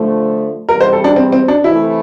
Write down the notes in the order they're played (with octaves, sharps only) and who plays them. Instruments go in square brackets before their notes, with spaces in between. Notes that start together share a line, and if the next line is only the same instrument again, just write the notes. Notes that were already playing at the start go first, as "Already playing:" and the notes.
Already playing: [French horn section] D3 F3 A3
[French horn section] E2 C3 G3 [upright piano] A#4
[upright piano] C5
A4
D4
C4
C4
D4
[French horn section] C3 E3 A3 [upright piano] E4